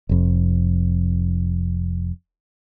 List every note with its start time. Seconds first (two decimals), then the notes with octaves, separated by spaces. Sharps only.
0.09 F1 F2